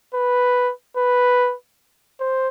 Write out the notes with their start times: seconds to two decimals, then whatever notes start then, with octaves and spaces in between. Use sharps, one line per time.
0.14 B4
0.97 B4
2.20 C5